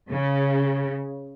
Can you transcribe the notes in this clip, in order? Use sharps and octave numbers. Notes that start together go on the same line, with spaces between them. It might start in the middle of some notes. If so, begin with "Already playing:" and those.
C#3